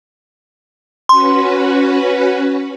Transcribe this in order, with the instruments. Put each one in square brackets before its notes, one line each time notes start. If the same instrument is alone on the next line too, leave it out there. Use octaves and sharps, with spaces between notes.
[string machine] C#4 F#4 B4 [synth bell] C6